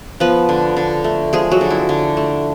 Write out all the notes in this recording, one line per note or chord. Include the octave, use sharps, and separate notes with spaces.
F3 B3 B4
D3
D3
A3
F3 G#3 G#4
F#3 F#4
D3
E4
D3
A3